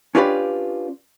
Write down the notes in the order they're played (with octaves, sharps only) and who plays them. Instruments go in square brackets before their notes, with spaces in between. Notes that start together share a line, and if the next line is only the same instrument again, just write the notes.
[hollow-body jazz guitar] C#4 D4 F4 G4 B4 D5